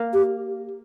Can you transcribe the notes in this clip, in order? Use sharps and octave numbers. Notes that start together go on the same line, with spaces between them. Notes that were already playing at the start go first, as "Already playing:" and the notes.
Already playing: A#3
G4